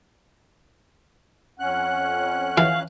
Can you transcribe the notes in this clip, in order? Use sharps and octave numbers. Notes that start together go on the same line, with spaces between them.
F2 C#4 F#5 F#6
E3 F5